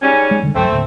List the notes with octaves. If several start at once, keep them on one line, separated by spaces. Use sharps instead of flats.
G#2 G3 C#4
G#3
E1 D3 G3
C2 G2 F#3 A3 C4
D#2 A2 D3